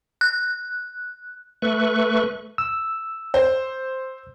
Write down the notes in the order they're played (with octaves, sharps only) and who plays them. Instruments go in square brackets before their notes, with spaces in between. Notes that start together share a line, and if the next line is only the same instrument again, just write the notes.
[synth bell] F#6
[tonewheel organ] A3 B4 C#6
[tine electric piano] E6
[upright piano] C5